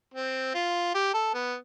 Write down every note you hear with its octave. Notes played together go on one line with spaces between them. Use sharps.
C4
F4
G4
A4
B3